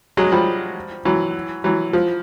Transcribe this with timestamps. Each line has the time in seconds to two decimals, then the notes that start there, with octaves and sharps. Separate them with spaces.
0.17 F#3 G#3
0.32 F3 G3
1.05 E3 F#3
1.64 E3 F#3
1.93 F3